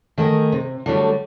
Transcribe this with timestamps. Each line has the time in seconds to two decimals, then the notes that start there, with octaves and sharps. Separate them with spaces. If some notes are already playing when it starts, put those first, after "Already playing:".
0.18 D#3 A3 G#4 A#4
0.52 C3
0.86 D3 F#3 G3 A3